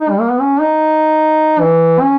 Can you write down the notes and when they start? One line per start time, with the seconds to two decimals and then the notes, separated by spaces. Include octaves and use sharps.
0.01 D#4
0.10 G3
0.20 A#3
0.31 B3
0.41 C#4
0.61 D#4
1.61 E3
2.01 C#4